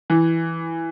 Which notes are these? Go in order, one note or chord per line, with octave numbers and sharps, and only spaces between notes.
E3